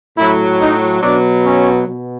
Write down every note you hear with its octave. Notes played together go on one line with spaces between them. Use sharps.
A2 F#3 E4
D#4
B2 F#3 D4
C#4
B2